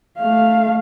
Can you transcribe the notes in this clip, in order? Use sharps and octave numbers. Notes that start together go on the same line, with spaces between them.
A3 F5